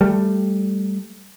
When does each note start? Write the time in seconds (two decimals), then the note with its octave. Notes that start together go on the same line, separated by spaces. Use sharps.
0.01 G3 A3